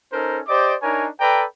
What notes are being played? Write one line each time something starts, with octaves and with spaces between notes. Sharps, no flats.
C#4 D#4 A4 A#4 C5
G4 C5 D5 D#5 D6
D4 D#4 A#4 C#5 G#5
A4 B4 D5 G5 A#5